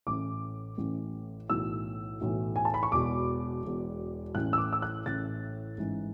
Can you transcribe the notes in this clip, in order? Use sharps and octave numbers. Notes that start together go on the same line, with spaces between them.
A1 A2 E3 D6
A1 A2 E3
B1 A2 E3 E6
B1 A2 E3
G#5
A5
B5
C#6
E1 E2 B2 D6
E1 E2 B2
A1 A2 E3 F#6
E6
D6
E6
F#6
A1 A2 E3 A6
A1 G#2 E3